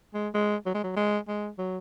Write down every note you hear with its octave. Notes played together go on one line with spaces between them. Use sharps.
G#3
G#3
F#3
G#3
F#3
G#3
G#3
F#3